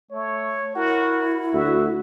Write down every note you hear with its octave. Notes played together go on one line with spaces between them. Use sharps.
A3 C#5
E4 F#4 A#4
D2 F#4 E5